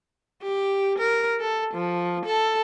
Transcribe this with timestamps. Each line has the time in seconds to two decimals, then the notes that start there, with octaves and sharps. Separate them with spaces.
0.42 G4
0.99 A#4
1.40 A4
1.74 F3
2.26 A4